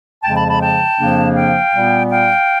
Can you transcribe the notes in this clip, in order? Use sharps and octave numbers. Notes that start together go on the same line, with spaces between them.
F2 C#3 F3 G#3 G5 A5
A5 B5
A5 B5
G5 A5
F2 C#3 F3 A#3 D4
F5 G5
A#2 G3 B3
F5 G5